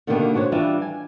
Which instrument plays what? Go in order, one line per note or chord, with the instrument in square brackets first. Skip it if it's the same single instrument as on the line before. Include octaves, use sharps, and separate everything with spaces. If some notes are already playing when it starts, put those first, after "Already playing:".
[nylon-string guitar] B2 D3 D#3 G3 A#3 B3
D4 F#4 C5 C#5
E3 G3 D4 F4 G4 E5
G#5